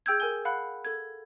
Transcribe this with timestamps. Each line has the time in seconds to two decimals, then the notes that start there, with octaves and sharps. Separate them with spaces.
0.06 G#4 G5 E6 G6 G#6
0.20 A#4 G#5 G7
0.45 F5 F#5 B5 F#6
0.85 A4 G#6